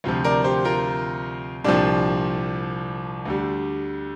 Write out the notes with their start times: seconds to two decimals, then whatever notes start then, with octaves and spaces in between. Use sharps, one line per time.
0.04 D2 C3 F3 F4
0.24 A#4 D5
0.44 G4 C5
0.65 F4 A#4
1.64 C2 A#2 F3 D4 G4
3.25 D2 D3 G3